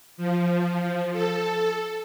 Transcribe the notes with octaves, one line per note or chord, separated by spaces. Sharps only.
F3
A4